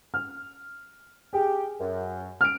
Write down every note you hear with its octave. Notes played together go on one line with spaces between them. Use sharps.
F6
G4 G#4
F#2
F6 D7